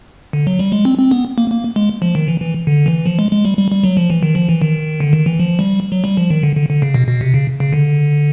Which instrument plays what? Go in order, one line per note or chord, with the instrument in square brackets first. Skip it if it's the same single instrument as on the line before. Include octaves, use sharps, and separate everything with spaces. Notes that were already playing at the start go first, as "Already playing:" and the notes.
[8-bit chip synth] D3
F#3
G3
G#3
C4
C4
B3
A#3
A#3
G#3
F3
D#3
E3
E3
D3
E3
F3
G#3
G#3
G3
G3
G3
F#3
F3
E3
D#3
F3
E3
D#3
D3
D#3
E3
F3
G3
F#3
G3
F3
D#3
D3
D3
D3
C#3
B2
B2
C3
C#3
C#3
D3